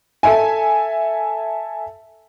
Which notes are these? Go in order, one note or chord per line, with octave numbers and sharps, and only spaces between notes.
A4 E5 G#5